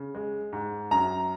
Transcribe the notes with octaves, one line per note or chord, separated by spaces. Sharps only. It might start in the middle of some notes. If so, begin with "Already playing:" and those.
Already playing: C#3
G#3
G#2
F#2 A#5